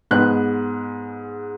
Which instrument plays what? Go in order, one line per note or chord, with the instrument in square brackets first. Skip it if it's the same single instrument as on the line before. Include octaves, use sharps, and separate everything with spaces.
[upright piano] G#2 G#3 B3 F#6